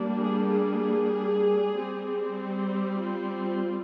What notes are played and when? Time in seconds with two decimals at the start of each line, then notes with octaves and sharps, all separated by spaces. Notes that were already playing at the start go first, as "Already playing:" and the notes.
Already playing: G3 A#3 D4
0.19 G#4
0.50 G#4
1.75 G3 C4
2.68 G4
3.00 F4